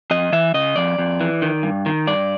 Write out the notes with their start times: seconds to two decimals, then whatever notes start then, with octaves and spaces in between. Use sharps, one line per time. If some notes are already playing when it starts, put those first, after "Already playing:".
0.11 F2 D#5
0.32 E3 E5
0.54 C#3 D#5
0.76 F2 D5
0.98 F2
1.21 E3
1.42 D#3
1.63 G2
1.86 D#3
2.07 G2 D5